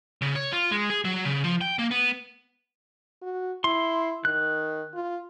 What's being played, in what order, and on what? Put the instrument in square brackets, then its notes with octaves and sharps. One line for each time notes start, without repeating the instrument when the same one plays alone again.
[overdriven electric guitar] C#3
C#5
F4
G#3
G#4
F#3
C#3
F3
G5
A#3
B3
[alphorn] F#4
[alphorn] E4 [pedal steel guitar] C6
[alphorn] D#3 [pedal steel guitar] F#6
[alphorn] F4